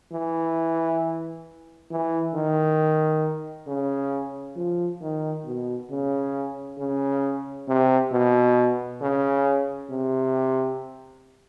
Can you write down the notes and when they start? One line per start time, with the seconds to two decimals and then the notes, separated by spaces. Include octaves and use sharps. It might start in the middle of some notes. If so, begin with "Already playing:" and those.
0.13 E3
1.91 E3
2.35 D#3
3.68 C#3
4.56 F3
5.01 D#3
5.45 B2
5.90 C#3
6.78 C#3
7.68 C3
8.12 B2
9.01 C#3
9.90 C3